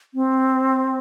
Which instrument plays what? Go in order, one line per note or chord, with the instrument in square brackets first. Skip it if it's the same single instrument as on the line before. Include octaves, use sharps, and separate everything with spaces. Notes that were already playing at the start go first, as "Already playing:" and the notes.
[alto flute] C4